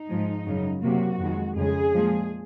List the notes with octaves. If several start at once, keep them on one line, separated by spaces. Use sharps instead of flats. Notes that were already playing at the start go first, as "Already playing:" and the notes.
Already playing: D#4
G#2 F3 G#3
F#2 C#3 F#3
C3 F#3 A#3 F#4
F2 D#3 G#3
F2 C#3 G#3 G#4
A#2 F3 G#3